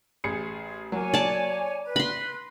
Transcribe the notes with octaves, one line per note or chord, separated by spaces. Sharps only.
A1 G#4 C#7
F#3 A#3 C#5 G#5
D5 A5
B4
B5 C6 A#6